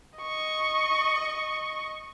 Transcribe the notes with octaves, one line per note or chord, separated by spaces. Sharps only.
D#5 C#6